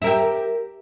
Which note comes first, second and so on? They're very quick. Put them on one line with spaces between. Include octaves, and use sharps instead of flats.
E5 A#4 G4